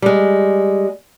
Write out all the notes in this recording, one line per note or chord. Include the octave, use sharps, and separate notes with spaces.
G3 G#3